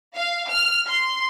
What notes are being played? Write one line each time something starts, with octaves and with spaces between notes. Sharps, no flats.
F5
F6
C6